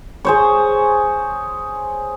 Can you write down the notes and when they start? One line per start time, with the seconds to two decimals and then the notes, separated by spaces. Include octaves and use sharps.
0.25 G#4 C5 C#5